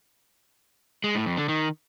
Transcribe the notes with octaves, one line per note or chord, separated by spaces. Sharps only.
G#3
A2
F2
D3
D#3